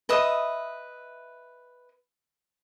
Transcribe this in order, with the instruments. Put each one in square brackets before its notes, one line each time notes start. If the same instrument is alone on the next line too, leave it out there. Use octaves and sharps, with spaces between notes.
[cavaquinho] B4 D#5 E5 D#6